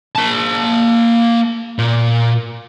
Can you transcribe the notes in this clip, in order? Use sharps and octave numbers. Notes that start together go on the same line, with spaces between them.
A#3 A5
A#2